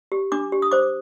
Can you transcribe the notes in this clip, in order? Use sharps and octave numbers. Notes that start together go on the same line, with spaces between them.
G4
D4 D6
G4
D#6
C5 D6